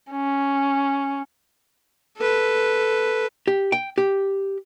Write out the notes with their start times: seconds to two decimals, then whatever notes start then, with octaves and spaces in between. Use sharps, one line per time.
0.11 C#4
2.17 A4 B4
3.48 G4
3.72 G5
3.98 G4